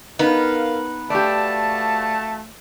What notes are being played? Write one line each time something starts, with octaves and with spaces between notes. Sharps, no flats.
B3 D#4 A#4 B4 F5
A3 F#4 G4 D5 F5 A5